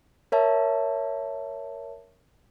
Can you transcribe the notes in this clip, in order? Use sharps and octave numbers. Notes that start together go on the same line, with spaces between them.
A#4 C#5 E5 A5